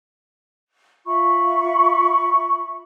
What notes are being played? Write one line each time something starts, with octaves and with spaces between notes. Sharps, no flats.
F4 E5 B5 C#6